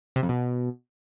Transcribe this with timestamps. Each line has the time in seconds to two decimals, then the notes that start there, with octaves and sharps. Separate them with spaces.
0.16 C3
0.23 F2
0.29 B2